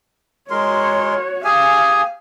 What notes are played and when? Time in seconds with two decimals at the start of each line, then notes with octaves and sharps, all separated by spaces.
0.50 G#3 F#4 A#4 C#5 C6
1.44 G4 G#4 F5 G#5